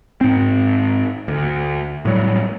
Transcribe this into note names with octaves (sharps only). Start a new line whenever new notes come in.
G#2 C4
D2
A2 F#3 G3